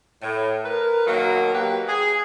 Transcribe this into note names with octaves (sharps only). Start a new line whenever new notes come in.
A2
A#4 B4
B2 D#3 F#3 A#3
F#3 A#3 G4 B4
G#4